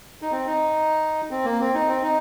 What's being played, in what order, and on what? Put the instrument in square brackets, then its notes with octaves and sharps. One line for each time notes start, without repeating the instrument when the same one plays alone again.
[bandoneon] D#4
C4
D#4
C4
A#3
C4
D#4
C4
D#4